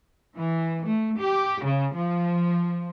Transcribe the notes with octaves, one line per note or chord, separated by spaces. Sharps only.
E3
A3
G4
C#3
F3